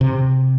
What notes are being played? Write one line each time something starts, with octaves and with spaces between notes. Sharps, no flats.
C3